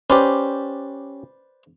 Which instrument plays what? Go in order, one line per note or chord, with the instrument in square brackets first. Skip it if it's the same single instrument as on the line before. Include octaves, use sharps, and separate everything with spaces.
[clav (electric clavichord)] C#4 G4 [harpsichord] B4 C5 D5